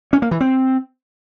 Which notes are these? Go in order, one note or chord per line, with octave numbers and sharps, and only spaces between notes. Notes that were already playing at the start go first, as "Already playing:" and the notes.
C#4
A#3
E3
C4